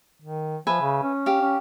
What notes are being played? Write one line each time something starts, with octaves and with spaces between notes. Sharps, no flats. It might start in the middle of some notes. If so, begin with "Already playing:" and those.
D#3
F3 B4 E5 G#5
C#3
C#4
G4 F5
C#4